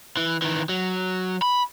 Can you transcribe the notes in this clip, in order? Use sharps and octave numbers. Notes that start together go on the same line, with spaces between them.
E3
D#3 E3
F#3
B5